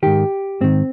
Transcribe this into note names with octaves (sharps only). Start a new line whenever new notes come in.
G#2 D#3 G4
G#2 D#3 C4